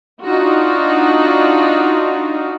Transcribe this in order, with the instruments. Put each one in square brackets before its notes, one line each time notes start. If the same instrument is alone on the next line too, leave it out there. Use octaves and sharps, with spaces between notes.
[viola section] D4 D#4 F4 F#4